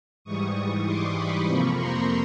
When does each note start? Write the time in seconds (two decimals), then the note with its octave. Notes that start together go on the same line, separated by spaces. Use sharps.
0.24 G#2 E3 G3 C#6 D#6
0.86 C6 D6
1.15 B5 C#6
1.46 F2 C3 F3 A#3
1.76 A#5 C6